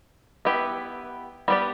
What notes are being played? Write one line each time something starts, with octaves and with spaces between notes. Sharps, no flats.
B3 E4 G4 B4
G3 B3 G4 B4 D5